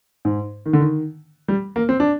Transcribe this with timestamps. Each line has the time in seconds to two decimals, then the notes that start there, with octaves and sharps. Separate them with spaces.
0.25 G#2
0.66 D#3
0.73 D3
0.80 D#3
1.48 G3
1.76 A#3
1.89 C4
2.00 D4